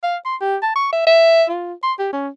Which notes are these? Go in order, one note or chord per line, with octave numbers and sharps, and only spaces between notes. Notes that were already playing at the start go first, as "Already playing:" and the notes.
F5
C6
G4
A5
C#6
E5
E5
F4
C6
G4
C#4